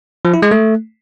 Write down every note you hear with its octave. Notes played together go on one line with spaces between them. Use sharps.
F3
E4
G#3
A3